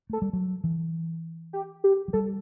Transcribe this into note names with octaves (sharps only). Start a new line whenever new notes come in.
A3 A4
G3
F#3
E3
G4
G4
F#3
G3 A4